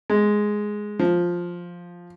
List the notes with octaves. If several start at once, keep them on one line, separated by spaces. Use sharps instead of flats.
G#3
F3